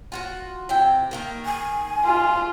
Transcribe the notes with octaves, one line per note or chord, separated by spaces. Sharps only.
F4 F#4 F#5
C3 E4 G5
D#3 A#3 A#4
G#5
F4